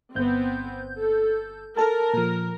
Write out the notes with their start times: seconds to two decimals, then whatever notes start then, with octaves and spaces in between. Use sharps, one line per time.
0.15 G1 B3 C4 G6
1.00 A4
1.77 A4 A#4 A5
2.13 A#2 F3